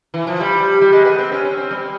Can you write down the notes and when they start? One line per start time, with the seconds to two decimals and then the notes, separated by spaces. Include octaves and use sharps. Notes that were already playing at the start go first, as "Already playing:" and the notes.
0.14 E3
0.27 F3
0.40 G3
0.81 G3
0.92 G#3
1.05 B3
1.18 C4
1.32 C#4
1.45 C#4
1.57 C4
1.71 G3